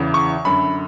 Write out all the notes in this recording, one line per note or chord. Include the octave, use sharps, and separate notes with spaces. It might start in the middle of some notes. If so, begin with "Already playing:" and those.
Already playing: E2 C#3 E3
C#6
F#2 D3 B5